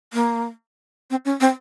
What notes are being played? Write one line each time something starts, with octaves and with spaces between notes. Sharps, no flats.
A#3
C4
C#4
C4